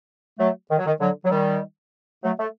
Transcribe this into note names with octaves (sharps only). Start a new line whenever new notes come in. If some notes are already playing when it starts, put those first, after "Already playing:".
F#3 A3
D#3
F#3
D#3
D3 F#3
F#3
D#3 G3
F#3 A3
A3